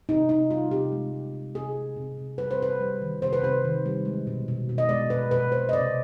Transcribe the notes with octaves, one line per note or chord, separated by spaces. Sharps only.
C3 D#4
C3 D#4
G3 F4
C3 G4
G#3
G#3
C3
C3 G#4
G#3
C3
C3
G3 B4
C5
C3 B4
G3
D#3
C3 C5
B4
C3 C5
D#3
G3
G#3
B2
B2
B2
D#5
G#3 D5
B2 B4
B2 B4
B2 C5
D#5
C3 D5